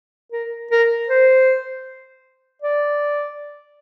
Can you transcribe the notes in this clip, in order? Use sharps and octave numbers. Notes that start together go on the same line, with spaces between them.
A#4
A#4
C5
D5